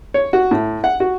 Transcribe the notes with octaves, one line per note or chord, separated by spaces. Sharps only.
C#5
F#4
A2
F#5
F#4